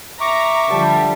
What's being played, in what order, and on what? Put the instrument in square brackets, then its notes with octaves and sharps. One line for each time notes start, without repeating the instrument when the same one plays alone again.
[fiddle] E5 [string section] A#5 [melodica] C#6 D6
[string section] D3 F3 G3 [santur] A5